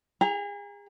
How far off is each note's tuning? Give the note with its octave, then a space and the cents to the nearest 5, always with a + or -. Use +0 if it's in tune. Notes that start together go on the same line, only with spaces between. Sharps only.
G#4 -35 A#5 +0